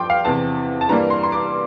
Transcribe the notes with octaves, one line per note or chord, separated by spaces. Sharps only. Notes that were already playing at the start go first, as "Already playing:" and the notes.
Already playing: G2 F3 G5 C6 D6
F5
E2 C3 E3 A5
A5
G2 E3 G3 A#3 A#5
C6
C6
D6